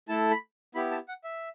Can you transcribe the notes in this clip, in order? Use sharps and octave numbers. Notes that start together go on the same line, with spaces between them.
A3 E4 A4 A5
B5
B3 E4 G4 B5
A5
F#5
E5